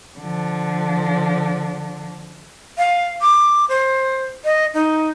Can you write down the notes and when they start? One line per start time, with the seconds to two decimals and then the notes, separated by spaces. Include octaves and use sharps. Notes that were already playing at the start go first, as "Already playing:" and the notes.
0.20 D3 F3
2.78 F5
3.21 D6
3.69 C5
4.44 D#5
4.74 D#4